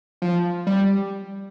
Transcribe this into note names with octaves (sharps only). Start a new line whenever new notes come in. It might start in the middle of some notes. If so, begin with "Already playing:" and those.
F3
G3